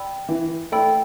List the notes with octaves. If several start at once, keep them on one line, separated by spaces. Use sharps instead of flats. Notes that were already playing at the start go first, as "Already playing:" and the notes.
Already playing: D5 G5 B5 E6
E3
A3 D5 G5 B5 E6